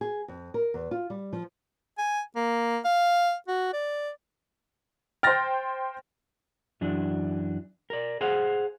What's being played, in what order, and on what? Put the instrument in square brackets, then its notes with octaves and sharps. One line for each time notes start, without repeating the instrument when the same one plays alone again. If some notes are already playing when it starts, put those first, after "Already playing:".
[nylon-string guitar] G#4
F2
A#4
E2
F4
G3
F3
[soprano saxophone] G#5
A#3
F5
F#4
D5
[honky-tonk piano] C5 G5 [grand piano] F6 A6 A#6
[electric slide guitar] F#2 E3 D4
A#4 D5
G#4 C5 F5 F#5